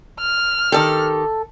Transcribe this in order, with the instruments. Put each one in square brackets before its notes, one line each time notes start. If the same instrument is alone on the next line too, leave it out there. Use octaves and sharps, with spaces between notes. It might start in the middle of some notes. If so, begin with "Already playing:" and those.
[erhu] F6
[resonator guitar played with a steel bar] D#3 G4 [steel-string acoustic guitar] A4 A5